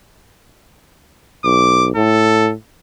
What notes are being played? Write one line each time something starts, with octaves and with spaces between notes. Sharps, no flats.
B1 D6
A2 A4